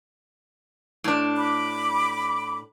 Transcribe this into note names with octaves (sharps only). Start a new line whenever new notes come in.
A2 D4
B5 D6